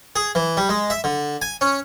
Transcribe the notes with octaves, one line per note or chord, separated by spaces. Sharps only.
G#4
E3
G3
G#3
E5
D3
G#5
C#4